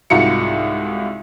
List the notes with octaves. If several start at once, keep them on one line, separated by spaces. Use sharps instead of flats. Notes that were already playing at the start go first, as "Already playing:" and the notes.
C2 G#2 F4 F#4 C#7